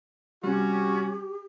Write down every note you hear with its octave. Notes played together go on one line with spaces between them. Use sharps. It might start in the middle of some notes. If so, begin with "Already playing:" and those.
C3 G3 C#4 F#4 G4